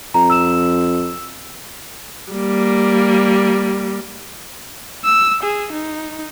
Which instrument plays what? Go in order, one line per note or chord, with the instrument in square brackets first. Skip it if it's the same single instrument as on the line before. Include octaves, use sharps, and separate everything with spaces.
[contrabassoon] F2 [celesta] A#5
[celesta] E6 E7
[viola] G3 A#3
[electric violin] E6
G#4
D#4